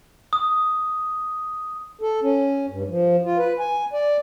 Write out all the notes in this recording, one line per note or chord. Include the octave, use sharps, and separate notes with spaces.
D#6
A4
C#4
G2
F3
F4
B4
G#5
D5